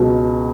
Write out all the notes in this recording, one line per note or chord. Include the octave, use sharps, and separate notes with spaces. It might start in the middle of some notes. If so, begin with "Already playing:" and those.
Already playing: C#2 B2 F#3